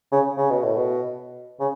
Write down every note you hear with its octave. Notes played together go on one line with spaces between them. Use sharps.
C#3
C#3
B2
A2
B2
C#3